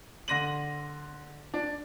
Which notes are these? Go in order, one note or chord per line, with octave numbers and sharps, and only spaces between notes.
D3 C6 A#6 D#7 F#7
D4